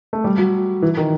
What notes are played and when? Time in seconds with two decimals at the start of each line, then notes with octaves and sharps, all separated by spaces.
0.13 A3
0.24 G3
0.38 F#3
0.82 E3
0.97 D#3